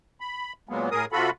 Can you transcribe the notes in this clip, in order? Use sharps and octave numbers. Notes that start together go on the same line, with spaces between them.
B5
A#2 F#3 G#3 A#3 B3
A2 G#4 A#4 D#6
C3 F4 F#4 A4 B5